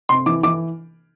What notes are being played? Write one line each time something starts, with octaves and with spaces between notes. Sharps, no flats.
C3 C6
E3 D6
E3 D6